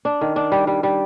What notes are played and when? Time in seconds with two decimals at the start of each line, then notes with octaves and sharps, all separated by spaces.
0.05 D4
0.21 D#3
0.36 D4
0.52 G3
0.67 G3
0.83 G3